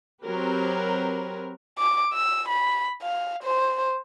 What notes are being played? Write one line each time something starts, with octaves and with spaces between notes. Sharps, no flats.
F#3 C4 G4 A#4 B4
D6
E6
B5
F5
C5